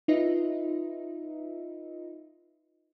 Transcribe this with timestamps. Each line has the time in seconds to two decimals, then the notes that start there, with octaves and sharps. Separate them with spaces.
0.08 D#4 F4 B4 D#5 E5